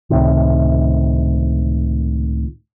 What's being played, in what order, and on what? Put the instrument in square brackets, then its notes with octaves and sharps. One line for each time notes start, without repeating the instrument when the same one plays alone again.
[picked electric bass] C#2 A2 C3 D#3